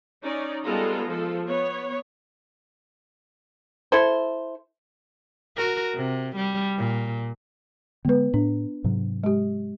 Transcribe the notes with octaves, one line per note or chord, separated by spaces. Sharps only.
C#4 D#4 D5
G3 G#3 B3 F4 A4 A#5
F3 A4
B3 C#5
E4 A4 C5
F#4 A#4
C3
G3
A#2
D3 G#3 B3 B4
A2 D4
G#2 C3 F#3
G#3 G4